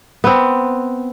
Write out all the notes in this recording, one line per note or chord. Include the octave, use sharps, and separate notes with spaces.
B3 C4